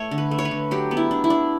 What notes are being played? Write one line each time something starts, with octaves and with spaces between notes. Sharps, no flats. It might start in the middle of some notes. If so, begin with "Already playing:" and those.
Already playing: A3 C#5
D3
B4
A3
C#5
B4
D3
F#3 G4
B3
E4
D4
E4
D4